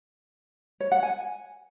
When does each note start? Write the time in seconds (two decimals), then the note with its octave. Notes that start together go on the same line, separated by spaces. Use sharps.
0.80 C#5
0.92 F#5
1.03 G#5